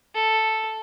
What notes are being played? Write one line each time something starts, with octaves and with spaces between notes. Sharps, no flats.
A4